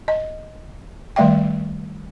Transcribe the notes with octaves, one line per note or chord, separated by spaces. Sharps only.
D#5
D#3 G3 A3 D5 E5 G5